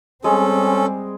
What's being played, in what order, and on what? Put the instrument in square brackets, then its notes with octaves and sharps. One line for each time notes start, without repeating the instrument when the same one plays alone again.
[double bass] G3 C4 [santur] G#3 [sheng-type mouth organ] C#4 A4